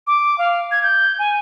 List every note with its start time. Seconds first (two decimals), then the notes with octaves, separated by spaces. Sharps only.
0.07 D6
0.38 F5
0.71 G#6
0.83 G6
1.19 G#5